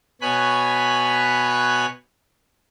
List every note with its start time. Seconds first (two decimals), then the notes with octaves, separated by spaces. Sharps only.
0.21 B2 C#5 G#5 B5 F#6